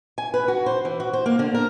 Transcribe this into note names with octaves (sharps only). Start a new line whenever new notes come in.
G#5
B4
F#4
C5
E3
F#4
C5
A#3
D3
A#4